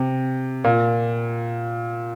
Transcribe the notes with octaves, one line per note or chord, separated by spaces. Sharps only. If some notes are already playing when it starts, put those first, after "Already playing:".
Already playing: C3
A#2